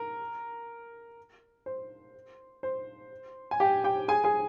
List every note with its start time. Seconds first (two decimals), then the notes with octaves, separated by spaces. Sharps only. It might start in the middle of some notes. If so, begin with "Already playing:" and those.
Already playing: A#4
1.66 C5
2.63 C5
3.51 G#5
3.60 G4 G5
3.84 G4 G5
4.08 G#4 G#5
4.24 G#4 G#5